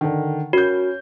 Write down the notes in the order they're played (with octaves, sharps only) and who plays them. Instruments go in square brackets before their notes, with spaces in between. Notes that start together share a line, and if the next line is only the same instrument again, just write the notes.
[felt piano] D3 D#3
[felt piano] C#4 A#4 G6 [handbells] F#4